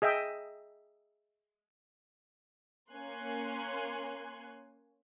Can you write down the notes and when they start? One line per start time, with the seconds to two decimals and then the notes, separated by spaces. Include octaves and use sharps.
0.02 G#4 D#5 E5 G5 D#6
2.91 A#3 C#4 C#5 G#5 C6 F#6